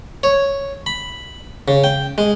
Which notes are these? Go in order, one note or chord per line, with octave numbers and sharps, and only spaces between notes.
C#5
B5
C#3
G5
G#3